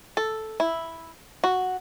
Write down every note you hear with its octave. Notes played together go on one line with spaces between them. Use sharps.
A4
E4
F#4